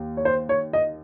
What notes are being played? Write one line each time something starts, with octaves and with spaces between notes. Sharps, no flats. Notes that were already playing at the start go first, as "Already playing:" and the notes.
Already playing: D#2
C#5
C5
C#5
D#5